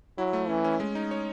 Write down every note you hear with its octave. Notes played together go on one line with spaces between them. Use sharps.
F#3 E4
A3
E3 C#4
C#4
G#3
D#4
C#5